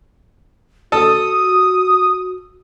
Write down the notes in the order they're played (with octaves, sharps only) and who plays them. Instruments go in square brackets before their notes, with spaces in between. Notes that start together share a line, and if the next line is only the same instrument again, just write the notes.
[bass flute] F#4 [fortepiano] A4 [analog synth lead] D#6